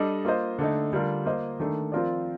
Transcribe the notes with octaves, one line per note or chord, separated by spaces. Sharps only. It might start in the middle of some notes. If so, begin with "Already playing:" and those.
Already playing: G3 D4 A4 D#5
A#3 F4 C5 D#5
D3 A3 D#4
D3 G3 D4 F4 A#4
A#3 F4 C5 D#5
D#3 A3 D4 A4
F3 C4 F4 A#4 D5